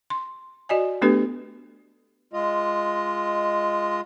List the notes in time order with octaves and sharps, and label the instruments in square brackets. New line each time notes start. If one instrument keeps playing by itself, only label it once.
[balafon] C6
F#4 D5 D#5 G#5
A3 B3 D4 G4 A4 B4
[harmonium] G#3 F4 D#5